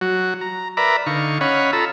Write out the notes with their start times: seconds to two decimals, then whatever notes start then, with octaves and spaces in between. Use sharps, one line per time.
0.01 F#3 F#4
0.41 A#5
0.77 A#4 B4 D5 E5 A#5 B5
1.06 D3 D#4 F5 C#6
1.41 C#4 C#5 D#5 F5 F#5 B5
1.73 F4 A4 A#5 B5 E6